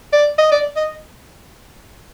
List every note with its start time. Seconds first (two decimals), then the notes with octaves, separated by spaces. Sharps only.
0.13 D5
0.38 D#5
0.51 D5
0.76 D#5